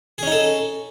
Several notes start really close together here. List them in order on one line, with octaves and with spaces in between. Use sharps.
G#4 C#4 D#4 A4